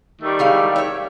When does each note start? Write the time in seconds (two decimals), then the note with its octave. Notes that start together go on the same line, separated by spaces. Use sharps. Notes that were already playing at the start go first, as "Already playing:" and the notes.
0.22 D#3 G3 A3
0.39 G#3 E4 F5
0.76 C#5 E5